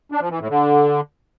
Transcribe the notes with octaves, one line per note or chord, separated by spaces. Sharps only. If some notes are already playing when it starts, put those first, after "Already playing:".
D4
F3
E3
A2
D3